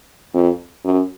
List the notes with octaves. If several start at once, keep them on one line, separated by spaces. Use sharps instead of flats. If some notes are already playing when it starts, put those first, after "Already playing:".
F2
F#2